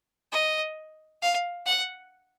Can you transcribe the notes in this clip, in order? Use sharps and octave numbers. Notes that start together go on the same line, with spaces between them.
D#5
F5
F#5